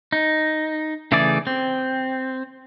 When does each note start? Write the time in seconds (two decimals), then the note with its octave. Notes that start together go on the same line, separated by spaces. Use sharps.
0.12 D#4
1.12 C#3 E3 A3 G#4 D5
1.47 C4